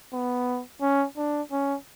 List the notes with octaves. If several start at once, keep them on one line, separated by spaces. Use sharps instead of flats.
B3
C#4
D4
C#4